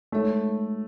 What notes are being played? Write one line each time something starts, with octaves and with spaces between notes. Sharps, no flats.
G#3 A3 D#4 A4 C#5 E5